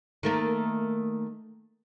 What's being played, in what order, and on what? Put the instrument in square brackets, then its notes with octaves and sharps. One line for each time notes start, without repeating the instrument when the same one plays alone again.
[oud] D#3 A3 A#3